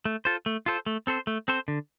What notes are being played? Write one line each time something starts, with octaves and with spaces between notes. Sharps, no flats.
A3
F4 A4 C5
A3
F4 A4 C5
A3
C4 A4 C5
A3
C4 A4 C5
D3